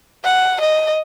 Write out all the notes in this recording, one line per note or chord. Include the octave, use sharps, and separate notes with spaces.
F#5
D#5